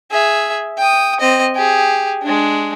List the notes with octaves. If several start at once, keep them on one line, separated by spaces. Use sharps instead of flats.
G#4 E5
G5 D#6
C4 D#5
G4 G#4
G#3 D4